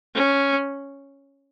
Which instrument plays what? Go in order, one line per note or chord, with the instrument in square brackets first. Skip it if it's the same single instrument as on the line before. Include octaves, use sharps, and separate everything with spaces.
[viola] C#4